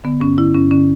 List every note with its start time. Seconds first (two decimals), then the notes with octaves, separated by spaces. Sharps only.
0.04 D3 B3
0.20 G2 C#4
0.37 D3 E4
0.55 G2 C#4
0.71 D3 C#4